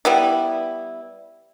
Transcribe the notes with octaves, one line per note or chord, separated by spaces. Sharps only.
G3 B3 E4